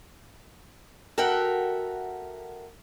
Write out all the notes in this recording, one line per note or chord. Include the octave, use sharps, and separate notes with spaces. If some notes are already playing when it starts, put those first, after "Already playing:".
F#4 A4 A#4 E5 F#5 G5